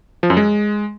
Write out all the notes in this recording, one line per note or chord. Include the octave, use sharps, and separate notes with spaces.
F3
F#2
G#3